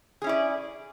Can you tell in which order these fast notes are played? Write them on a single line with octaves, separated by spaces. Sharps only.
G#4 C#4 E4 D5